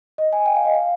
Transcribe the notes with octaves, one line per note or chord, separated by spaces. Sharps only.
D#5
G#5
G5
F5
D#5
F5